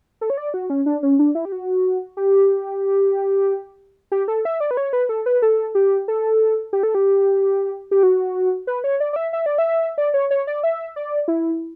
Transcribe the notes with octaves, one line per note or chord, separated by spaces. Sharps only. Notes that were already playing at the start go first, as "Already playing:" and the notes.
A4
C#5
D5
F#4
C#4
D4
C#4
D4
E4
G4
F#4
G4
G4
A4
E5
D5
B4
C#5
B4
A4
B4
A4
G4
A4
G4
A4
G4
G4
F#4
B4
C#5
D5
D5
E5
E5
D5
E5
D5
C#5
C#5
D5
E5
D5
E4